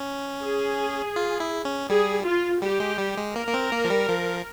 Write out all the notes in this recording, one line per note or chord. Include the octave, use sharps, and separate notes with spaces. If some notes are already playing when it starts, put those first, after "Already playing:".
Already playing: C#4
G#4
F4
E4
C#4
G3 G#4
F4
G3 G4
G#3
G3
G#3
A#3 A#4
A#3
C4
A#3
F3
G3
F3